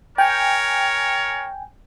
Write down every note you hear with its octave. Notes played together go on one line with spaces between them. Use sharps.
A#4 C#5 G5 G#5